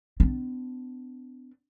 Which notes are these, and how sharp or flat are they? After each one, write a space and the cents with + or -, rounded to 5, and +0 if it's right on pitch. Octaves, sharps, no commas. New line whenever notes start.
B3 +45 D4 +0